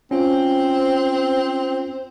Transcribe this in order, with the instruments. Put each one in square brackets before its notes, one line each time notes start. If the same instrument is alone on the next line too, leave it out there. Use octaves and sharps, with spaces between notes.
[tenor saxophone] C4 [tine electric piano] C#4 F4 [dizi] C5